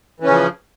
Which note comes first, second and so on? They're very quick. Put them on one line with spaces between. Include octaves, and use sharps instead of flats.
E3 C#4 C#3 F3